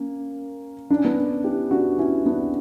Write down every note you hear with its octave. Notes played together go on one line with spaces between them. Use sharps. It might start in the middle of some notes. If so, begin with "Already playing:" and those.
Already playing: A#3 C#4
D4
C#4
B3 D4
E4 G4
D4 F#4
C#4 E4
B3 D4